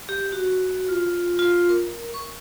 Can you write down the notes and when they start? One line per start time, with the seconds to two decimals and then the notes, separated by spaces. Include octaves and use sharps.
0.09 G4
0.32 F#4
0.89 F4
1.39 F4
1.69 A#4
2.14 C#6